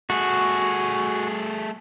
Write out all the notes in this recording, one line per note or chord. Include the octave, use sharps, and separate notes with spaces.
A3 F#4 G#4